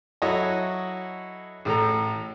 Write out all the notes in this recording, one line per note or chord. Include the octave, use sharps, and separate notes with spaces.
F#3 E4 F#4 A4 C#5 D#5
A1 A2 A4 A#5